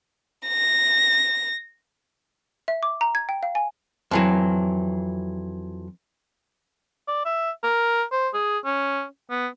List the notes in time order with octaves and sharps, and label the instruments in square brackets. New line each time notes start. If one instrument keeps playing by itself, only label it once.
[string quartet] A#6
[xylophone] E5
D6
A#5
G#6
G5
F5
G#5
[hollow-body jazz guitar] F2 E3 F#3
[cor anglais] D5
E5
A#4
C5
G#4
C#4
B3